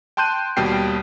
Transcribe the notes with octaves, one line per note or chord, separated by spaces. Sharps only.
G5 A5 C6 F#6 G6 D#7
D#2 B2 G3 G5 C7